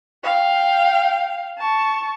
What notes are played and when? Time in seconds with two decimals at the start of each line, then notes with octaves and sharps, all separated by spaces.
0.24 F5 G5
1.59 A5 C#6